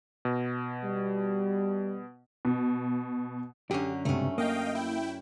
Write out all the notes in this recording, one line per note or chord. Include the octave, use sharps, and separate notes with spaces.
B2
G3
B2
F#2 D3 C#4 G4
C#2 G2 C3 A3 C#4
A#3 D#5 F5 G5
E4 G5